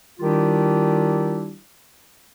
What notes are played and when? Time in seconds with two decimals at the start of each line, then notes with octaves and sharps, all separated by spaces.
0.20 D#3 G3 D4 E4 F4 G4